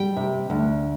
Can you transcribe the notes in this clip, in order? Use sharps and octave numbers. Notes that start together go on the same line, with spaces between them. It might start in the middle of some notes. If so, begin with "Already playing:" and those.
Already playing: G3 G5
C3
D2